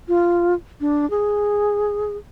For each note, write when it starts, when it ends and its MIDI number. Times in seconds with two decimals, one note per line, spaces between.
0.08 0.54 65
0.81 1.09 62
1.10 2.16 68